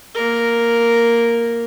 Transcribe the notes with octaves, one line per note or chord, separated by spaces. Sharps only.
A#3 A#4